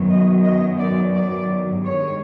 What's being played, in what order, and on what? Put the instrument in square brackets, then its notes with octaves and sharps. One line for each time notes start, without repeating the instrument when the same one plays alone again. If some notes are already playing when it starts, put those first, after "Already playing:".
Already playing: [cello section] F#2 D#3 F#3 B3
D#5
D#5
D5
D5
G2 D#3 G#3 C#5